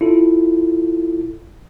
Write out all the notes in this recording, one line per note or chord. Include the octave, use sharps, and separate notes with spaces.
E4 F4 A4